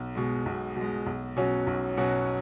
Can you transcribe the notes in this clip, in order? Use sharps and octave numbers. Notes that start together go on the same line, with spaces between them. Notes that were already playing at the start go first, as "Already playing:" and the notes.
Already playing: B1
B2 G#3
B1
B2
G#3
B1
B2 F#3 C#4 F#4
B1
B2 F#3 C#4 F#4